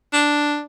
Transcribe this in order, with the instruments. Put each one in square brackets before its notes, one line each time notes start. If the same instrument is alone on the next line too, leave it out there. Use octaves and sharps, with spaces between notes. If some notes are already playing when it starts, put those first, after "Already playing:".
[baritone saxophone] D4